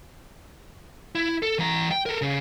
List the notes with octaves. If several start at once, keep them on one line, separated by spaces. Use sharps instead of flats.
E4
A4
E3 A#5
G5
A4 A#4
C#3